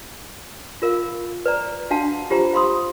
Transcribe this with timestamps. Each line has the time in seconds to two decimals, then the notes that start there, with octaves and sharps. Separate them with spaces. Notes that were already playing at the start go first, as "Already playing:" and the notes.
0.82 F4 A#4 F5
1.46 B4 D5 A#5
1.91 D4 F#4 F5 F#5 A5
2.30 F4 G4 C5 A#5
2.53 F5 B5 C6 D#6